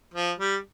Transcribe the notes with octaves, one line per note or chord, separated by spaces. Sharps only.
F3
G3